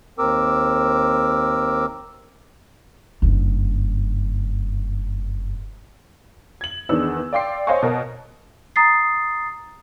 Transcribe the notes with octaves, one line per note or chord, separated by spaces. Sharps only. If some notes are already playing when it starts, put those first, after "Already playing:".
D#2 C4 A#4 D6 E6
F#1 G2
G#6 F#7
E2 D#3 B3 D4 G#4 E6
D5 F5 G5 C6 D6 C7
C5 C#5 D#5 F5 G#5 C#6
B2 A#4 D#6
A#5 D#6 A6 C7